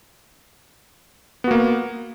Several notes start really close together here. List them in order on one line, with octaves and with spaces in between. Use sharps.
B3 F#4 A#3